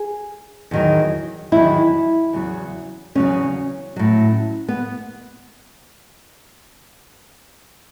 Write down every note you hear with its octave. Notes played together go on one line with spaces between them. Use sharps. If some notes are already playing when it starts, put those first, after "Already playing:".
Already playing: G#4
E2 D#3 F#3
E2 D#3 F#3 E4
E2 C#3 F#3
E2 C#3 F#3 C#4
A2 F#3
B3